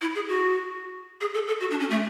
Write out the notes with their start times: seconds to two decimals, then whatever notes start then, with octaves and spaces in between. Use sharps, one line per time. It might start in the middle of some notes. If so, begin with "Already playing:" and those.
0.01 E4
0.15 G#4
0.29 F#4
1.21 G#4
1.34 A4
1.47 A4
1.60 F#4
1.71 D4
1.80 C#4
1.90 A3